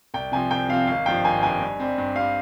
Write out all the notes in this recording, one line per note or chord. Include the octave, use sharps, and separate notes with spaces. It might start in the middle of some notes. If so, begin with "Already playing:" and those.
C2 G5
C3 F3 C4 G#5
C2 G5
C3 F3 C4 F5
G#1 F5
G2 F3 G5
G#1 G#5
G2 F3 G#5
G2
G3 C4
G2
G3 C4 F5